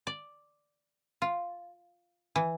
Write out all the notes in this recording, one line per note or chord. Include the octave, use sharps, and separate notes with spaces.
D5
F4
E3